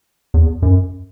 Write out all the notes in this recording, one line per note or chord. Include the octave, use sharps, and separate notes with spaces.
E2
F#2